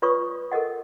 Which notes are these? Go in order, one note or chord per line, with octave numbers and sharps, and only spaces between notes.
F4 B4 C#5 D5 C#6 D#6
A4 A#4 D#5 F#5